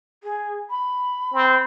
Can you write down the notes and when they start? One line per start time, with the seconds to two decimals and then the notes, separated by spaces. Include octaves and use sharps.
0.23 G#4
0.70 B5
1.34 C4